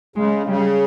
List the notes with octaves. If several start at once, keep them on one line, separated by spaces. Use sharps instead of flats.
C#3 G#3
C#3 G3